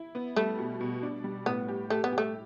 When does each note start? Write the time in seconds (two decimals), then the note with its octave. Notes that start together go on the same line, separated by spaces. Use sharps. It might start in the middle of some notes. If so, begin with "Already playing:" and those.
Already playing: E4
0.15 B3
0.36 G3 A3
0.59 B2
0.81 B2
1.03 D4
1.24 G3
1.46 A2 B3
1.68 G4
1.90 A3 G4
2.04 B3
2.12 G4
2.18 A3